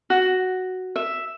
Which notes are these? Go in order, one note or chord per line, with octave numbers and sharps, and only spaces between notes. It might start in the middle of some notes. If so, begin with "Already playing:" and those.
F#4
E5